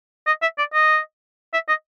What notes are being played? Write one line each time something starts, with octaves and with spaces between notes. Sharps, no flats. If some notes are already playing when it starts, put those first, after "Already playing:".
D#5
E5
D5
D#5
E5
D#5